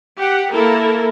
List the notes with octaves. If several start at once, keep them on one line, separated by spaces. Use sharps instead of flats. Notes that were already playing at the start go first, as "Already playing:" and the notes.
G4 F#5
A#3 E4 A4 A#4